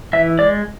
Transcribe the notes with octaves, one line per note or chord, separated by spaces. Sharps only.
E3 E5
G#3 D5